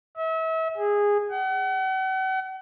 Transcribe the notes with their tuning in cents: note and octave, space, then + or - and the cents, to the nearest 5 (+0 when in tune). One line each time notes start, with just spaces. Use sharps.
E5 -35
G#4 -15
F#5 +40